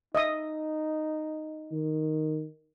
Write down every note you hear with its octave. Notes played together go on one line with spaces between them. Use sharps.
D#4 D#5 E5 D#6
D#3